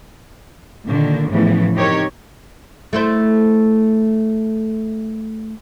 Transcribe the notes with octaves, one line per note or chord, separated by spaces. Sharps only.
A#2 D3 D#3
A2 C#3 E3 F3 A3 B3
C4 D#4 G4 A#4 C#5
A3 E4 C5